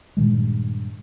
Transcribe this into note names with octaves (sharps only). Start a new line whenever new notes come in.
G2 A#2 D#3 G#3